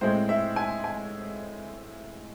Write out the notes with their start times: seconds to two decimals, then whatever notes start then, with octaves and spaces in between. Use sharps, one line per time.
0.01 A2 G#3 C4 C5
0.29 E5
0.56 G#5
0.84 G#5